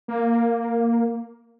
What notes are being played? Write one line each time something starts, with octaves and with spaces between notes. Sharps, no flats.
A#3